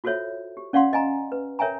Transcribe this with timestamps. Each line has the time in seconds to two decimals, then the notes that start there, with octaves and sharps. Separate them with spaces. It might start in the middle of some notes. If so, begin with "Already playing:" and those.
0.04 F4 F#4 A4 C5 C#5 E5
0.57 G4
0.73 C#4 D5 F5 F#5 C6
0.93 D#5 G#5 A#5
1.32 B4
1.59 A#4 C#5 E5 G5 G#5 A#5